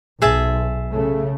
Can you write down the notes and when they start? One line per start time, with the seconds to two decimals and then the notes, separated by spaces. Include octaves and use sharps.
0.22 B1 G#4 E5 A5
0.93 C#3 A3